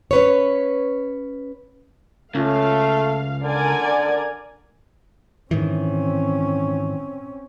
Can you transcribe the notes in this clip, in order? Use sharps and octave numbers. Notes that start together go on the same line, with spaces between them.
C#4 B4 C#5
C#2 A3 C#4 F4 F5
D3 A#4 D5 G#5
G#2 D#3 E3 C4 C#4